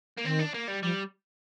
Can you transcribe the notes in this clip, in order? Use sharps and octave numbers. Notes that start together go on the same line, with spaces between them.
A#3
D#3 C4
D4
A#3
G3
F3 G3